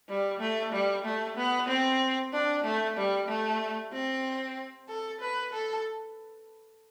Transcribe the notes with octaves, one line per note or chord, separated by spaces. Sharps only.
G3
A3
G3
A3
B3
C4
D4
A3
G3
A3
C4
A4
B4
A4